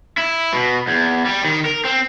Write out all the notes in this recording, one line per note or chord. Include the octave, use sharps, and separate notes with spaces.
E4
B2
E2
G3
D#3
A#4
C4